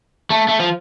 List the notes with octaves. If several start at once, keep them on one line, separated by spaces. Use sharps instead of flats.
A3
A3
F3